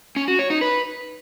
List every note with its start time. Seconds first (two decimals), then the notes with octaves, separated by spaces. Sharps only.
0.16 C#4
0.28 F#4
0.39 C#5
0.50 D#4
0.61 B4